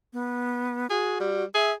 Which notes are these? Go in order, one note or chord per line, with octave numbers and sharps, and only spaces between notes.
B3
F#4 G#4
G3
G#4 E5